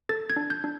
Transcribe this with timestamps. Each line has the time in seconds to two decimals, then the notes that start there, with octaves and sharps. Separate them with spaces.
0.09 A4 A6
0.30 G#6
0.36 D4
0.50 G6
0.64 D4